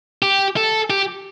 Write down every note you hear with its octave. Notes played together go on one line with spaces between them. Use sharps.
G4
A4
G4